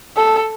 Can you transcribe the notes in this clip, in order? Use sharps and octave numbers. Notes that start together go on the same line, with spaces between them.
A4